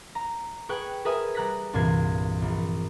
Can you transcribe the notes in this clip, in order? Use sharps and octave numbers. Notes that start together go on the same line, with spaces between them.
A#5
G#4 B4 G5 G#5 C#6 F#6
G#4 A#4 B4 E5 G#5 D#6
G3 A#5 F#6 A#6 B6
C2 G2 A#2 E3 G#6 C7
A#1